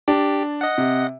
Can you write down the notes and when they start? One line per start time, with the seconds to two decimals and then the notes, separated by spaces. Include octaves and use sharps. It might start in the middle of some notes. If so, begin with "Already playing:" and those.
0.08 D4 G4
0.61 D#5 F#5
0.78 C3